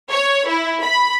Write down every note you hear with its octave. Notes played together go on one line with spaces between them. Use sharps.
C#5
E4
B5